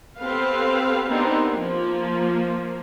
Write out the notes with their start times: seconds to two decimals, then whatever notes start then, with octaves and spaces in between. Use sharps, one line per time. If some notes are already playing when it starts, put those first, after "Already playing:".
0.18 B3 C4 G4 A4 B4 F5
1.07 B3 C4 D4 D#4 G4 A#4
1.50 F3 A#3